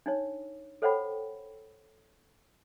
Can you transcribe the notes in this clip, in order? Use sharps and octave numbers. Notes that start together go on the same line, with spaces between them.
D4 D#4 C#5
A4 C5 C#5 F#5 G5 B5